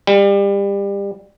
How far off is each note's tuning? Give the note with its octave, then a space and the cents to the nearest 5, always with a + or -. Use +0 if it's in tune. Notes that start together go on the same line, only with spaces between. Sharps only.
G3 +30